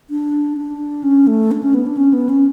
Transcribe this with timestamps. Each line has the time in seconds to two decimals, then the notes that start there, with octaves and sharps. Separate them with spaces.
0.10 D4
0.57 D4
1.03 C#4
1.27 A3
1.51 D4
1.63 C#4
1.74 B3
1.86 D4
1.97 C#4
2.13 B3
2.29 C#4